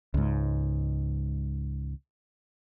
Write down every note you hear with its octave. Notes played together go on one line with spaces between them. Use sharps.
C#2 G#2